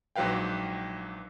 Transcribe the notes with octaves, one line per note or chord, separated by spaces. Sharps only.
A#1 G#2 F#3 B4 F5 G5